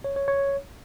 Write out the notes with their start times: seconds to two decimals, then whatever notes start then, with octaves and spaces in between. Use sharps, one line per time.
0.04 C#5
0.16 C#5
0.28 C#5